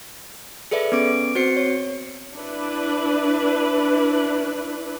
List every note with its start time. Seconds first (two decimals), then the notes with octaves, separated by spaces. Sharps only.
0.71 G#4 A4 B4 D5 E5
0.92 B3 C#4 D6 D7
1.35 C4 F#4 C5 C7 C#7
1.57 C#5
2.34 D4 E4 B4